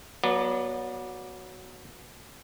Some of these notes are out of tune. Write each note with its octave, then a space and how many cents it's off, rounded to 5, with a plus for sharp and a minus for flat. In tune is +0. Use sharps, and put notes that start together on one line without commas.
F#3 +0 B3 -30 D5 +0